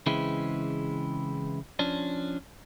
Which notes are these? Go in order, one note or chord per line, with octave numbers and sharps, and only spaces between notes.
C#3 E3 G#3 C4 E4
F3 C#4 D4